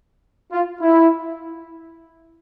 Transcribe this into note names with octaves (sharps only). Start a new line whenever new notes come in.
F4
E4